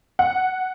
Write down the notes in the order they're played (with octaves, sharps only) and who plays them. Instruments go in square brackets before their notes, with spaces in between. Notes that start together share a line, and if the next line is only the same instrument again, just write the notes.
[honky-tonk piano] F#5